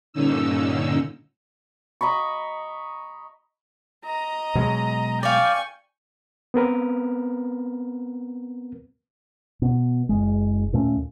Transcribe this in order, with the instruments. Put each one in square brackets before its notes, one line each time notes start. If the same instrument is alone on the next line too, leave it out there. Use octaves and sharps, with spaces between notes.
[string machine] G2 A#2 D3 C#4 D#4 E6
[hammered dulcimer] D#5 A#5 B5 C#6
[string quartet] D#5 A#5
[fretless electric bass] B2 F#3 G#3
[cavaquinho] D5 F5 [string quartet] G5 G#5 C#6
[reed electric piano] B3 C4 A#4 B4
[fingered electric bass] B2
F#1 G#3
D#2 A#2 A3 C#4